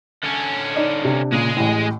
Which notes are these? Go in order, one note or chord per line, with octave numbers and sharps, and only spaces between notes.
D3 C#4
D#4 D5 D#5
C3 D4
A#2 C#3 G#3 G#4
A1 A2